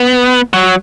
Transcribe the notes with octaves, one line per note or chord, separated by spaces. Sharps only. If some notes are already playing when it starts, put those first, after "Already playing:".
Already playing: B3
F#3